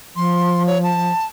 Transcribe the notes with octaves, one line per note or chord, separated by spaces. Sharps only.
F3 C6
C#5
A5